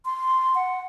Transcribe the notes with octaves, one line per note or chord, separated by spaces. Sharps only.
C6
F#5